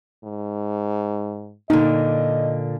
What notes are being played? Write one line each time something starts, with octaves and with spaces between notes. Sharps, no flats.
G#2
A#2 D3 D#4 D#5